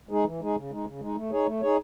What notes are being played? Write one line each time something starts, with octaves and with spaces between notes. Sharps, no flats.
G#3 D#4 G#4
E3
G#3 D#4 G#4
C#3
G#3 D#4
C#3
G#3 D#4
A3
D#4 G#4 C#5
A3
D#4 G#4 C#5